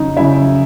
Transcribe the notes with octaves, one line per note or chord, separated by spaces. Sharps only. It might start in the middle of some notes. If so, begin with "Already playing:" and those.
Already playing: F2 C#3 F#3 D#4
C#3 F#3 E4 E5